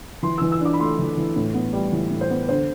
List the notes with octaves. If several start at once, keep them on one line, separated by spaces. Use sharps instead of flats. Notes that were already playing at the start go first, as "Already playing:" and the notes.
E3 C6
E3 E6
E6
D4 D6
B5
A3 C6
E3
E3
A2
B3
G3
E3
A2
C5
B3
D3 C5